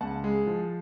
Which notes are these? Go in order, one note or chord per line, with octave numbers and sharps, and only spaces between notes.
C#2 F#5 A5
G#3
F3